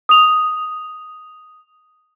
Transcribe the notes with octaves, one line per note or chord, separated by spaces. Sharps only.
D#6 F7